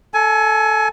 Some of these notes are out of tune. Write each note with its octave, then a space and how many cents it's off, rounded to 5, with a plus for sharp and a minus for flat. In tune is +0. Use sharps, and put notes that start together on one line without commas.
A4 +0 G#5 +25